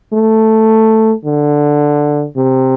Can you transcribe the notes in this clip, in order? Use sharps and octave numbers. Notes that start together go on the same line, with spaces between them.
A3
D3
C3